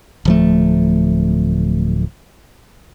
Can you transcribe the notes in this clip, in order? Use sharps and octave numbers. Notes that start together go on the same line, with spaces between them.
D1 F3 A3